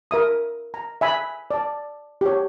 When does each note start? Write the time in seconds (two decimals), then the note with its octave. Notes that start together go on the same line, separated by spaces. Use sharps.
0.11 A#4 E5 D#6
0.74 A#5
1.01 E5 G#5 B5
1.51 D5 A5
2.21 G4 C#5